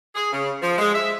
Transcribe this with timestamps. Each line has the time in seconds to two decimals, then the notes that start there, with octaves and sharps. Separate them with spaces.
0.15 G#4
0.31 C#3
0.62 F3
0.78 G#3
0.94 E5